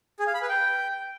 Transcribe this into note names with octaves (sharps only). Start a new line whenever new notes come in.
G#4
F5
B5
B4
G5